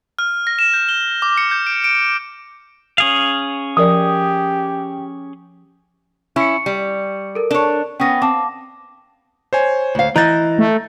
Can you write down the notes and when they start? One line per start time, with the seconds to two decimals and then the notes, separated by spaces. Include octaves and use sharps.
0.19 F6
0.47 A#6
0.59 E7
0.74 G6
0.89 G7
1.22 D6
1.38 C#7
1.51 G6
1.67 D7
1.84 D7
2.98 C#4 G#4 F5
3.77 F3 G4 A#4 D5 D#6
6.36 C#4 E4 C#6 C#7
6.66 G3
7.35 A4 A#4
7.51 D4 C#5
8.00 B3 C#4 G5 D#6 A#6
8.22 C4 F5 A5 D6
9.53 C5 C#5 G#5
9.95 D2 F5
10.16 E3 D#5 A#5 G6 A6
10.59 A3